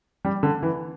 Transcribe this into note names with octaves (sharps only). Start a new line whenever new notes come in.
G3
D3
E3